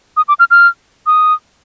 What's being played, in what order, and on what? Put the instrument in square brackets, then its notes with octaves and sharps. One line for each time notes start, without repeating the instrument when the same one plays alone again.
[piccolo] D#6
D6
F6
F6
D#6